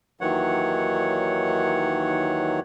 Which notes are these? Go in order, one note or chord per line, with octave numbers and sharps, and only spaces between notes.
D#2 D#3 E3 F#3 C#5 F#5